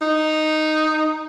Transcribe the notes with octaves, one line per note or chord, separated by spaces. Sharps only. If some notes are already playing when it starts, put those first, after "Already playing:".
D#4